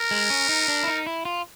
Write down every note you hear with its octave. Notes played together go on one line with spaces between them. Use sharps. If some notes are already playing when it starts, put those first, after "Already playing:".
Already playing: A#4
G#3
C#4
D#4
D4
E4
D#4
E4
F4